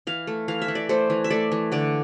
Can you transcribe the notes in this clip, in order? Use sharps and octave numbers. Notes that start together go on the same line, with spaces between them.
E3 F5
A3
E3 F5
E5
E3
D5
A3 C5
E3
E5
A3 D5
E3
D3 D5